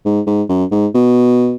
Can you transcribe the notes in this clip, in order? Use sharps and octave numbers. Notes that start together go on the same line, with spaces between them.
G#2
G#2
F#2
G#2
B2